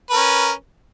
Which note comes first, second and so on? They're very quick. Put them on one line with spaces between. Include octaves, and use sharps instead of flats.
B4 A#4 C#4